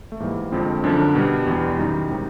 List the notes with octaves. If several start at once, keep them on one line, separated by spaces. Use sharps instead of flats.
A3
G#2 E3 G3 A#3
F2 D3 F3 G#3 C4
F#2 D3 F3 D4
B2 G3
E2 B2 G3
F#2 D#3 G3 D#4
C3 D#3 G#3